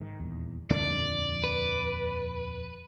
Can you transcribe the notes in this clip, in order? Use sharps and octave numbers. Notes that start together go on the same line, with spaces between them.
G#2 D#3
D#1 E2
D#1 F2 D3 A3 D4 D5
B4